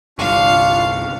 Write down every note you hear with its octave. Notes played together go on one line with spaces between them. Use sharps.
G1 C2 D4 F4 F5 C#6